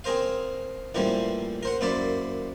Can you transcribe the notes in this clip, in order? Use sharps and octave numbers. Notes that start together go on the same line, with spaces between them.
C4 G#4 A#4 C5 F5
A1 E3 F3 G3 A#3 C5
A#4 C5 F#5
F#2 A#3 E4 C5 D5 E5